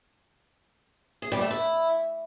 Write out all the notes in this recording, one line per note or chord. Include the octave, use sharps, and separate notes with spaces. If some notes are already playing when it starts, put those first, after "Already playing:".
G#4
G3
A3
E4